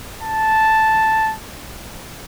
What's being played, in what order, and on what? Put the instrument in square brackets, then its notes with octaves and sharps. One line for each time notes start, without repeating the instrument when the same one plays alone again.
[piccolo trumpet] A5